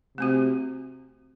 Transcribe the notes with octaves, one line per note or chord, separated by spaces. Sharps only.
C3 A3 C4 F#4